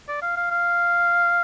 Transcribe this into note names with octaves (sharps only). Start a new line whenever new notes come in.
D5
F5
F5
F5